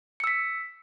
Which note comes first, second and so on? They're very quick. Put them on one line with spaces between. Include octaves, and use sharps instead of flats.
C#7 E6 B6